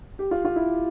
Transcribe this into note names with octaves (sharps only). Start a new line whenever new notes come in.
G4
F4
F4
E4